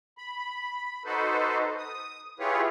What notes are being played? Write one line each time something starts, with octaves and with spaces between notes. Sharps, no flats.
B5
D#4 F#4 A4 B4 C5
D#6
E4 F4 G4 G#4 B4 C#5